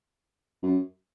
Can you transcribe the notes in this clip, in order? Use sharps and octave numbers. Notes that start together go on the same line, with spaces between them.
F#2